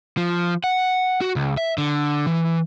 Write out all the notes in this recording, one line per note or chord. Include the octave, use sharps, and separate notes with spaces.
F3
F#5
F#4
C#2
E5
D3
E3